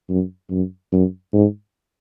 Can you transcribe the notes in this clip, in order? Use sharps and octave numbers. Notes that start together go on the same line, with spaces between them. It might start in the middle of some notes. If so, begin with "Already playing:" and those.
F#2
F#2
F#2
G#2